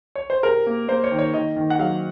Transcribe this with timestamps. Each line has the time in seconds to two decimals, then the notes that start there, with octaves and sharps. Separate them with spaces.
0.15 C#5
0.30 C5
0.43 C3 A#4
0.67 A#3
0.88 A#3 C5
1.04 C#5
1.11 D#3
1.19 C#5
1.33 D#3 D#5
1.56 D#3
1.70 F#5
1.79 F#3 F5